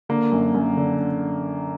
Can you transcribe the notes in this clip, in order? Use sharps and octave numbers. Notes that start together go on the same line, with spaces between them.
D3 A#3
F#2
F#2
D3